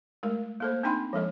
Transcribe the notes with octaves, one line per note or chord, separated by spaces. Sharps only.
G#3 A3 A#4
A#3 A4 C5
C4 D4 D#4 G5 B5 C6
F3 G#3 A4 D#5